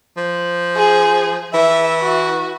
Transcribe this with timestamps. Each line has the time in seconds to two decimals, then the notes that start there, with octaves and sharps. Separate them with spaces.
0.17 F3
0.76 G#4
1.54 E3 E5
2.02 F#4